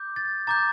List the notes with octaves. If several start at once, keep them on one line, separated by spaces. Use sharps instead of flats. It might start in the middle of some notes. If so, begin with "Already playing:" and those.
Already playing: D6 G6
A6
A#5 D6 G6 A6